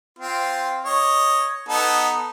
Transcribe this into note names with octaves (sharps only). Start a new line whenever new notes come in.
C4 F4
C#5 D#5
B3 D#4 A4